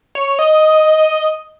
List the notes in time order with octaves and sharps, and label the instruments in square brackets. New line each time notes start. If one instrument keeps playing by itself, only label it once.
[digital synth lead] C#5
D#5